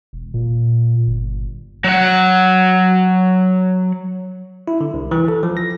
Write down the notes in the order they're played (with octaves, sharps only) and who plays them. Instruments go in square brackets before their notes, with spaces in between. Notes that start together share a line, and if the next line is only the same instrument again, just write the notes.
[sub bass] E1
A#2
G1
[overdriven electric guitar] F#3 F#5
[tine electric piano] E4
D3
C2
E3
A4
F3
A#6